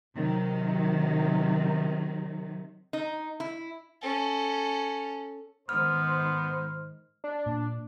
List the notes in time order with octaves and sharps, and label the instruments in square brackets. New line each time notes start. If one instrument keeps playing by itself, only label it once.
[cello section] C3 D#3 F#3
[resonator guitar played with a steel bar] D#4
E4
[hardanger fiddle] C#4 A4
[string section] G#2 D#3 [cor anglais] B3 [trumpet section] C5 [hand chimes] F6
[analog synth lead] D4
[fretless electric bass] A#2